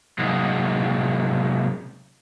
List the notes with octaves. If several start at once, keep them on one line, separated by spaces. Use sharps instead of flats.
C3 F#3 G#3 A#3 C#4 D#4